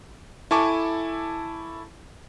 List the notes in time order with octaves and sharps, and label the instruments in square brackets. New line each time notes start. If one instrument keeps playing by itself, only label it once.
[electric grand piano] E4 A4 G#5 A5 C#6 D6